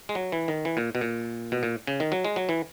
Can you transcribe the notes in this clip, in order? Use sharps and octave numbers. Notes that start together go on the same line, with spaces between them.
G#3
F#3
E3
D#3
E3
A#2
B2
A#2
B2
A#2
C#3
D#3
F#3
G#3
F#3
E3